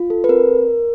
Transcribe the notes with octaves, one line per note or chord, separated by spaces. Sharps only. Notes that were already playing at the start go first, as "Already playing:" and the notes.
Already playing: F4
A4
B4
C4 A#4